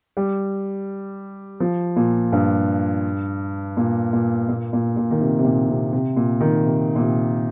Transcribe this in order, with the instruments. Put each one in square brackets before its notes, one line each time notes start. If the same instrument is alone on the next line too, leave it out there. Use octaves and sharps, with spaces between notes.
[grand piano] G3
F3
A#2
G2
A#2
A#2
A#2
A#2
A#2
D#3
C3
C3
A#2
C3
C3
A#2
D#3
C3
A#2
C3